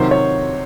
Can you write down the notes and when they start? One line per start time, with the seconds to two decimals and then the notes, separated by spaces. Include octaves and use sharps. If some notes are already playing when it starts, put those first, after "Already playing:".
Already playing: C3 D#3 F#3 C5
0.11 C#5